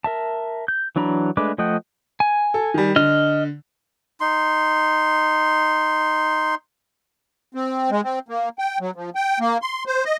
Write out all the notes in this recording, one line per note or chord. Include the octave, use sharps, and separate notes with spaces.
A#4 E5 A5
G6
E3 F#3 D4 A#5 B5
G#3 A3 D4 B4 D6
F3 A3 D#5 F#5 G5
G#5
A4
D#3 G3
D3 D#5 F6
D#4 C6
C4
G#3
C4
A#3
G5
F#3
F3
G5
A#3
C6
C5
D#5